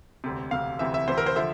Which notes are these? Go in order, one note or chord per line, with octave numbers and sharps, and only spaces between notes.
E1 D2 C3
E1 D2 C3 F5
D2 C3 E3 E5
E5
D2 C3 E3 C5
A#4
C5
D3 F3 E5